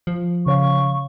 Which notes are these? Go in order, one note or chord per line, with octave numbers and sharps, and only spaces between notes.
F3
C#3 C#5 F5 C#6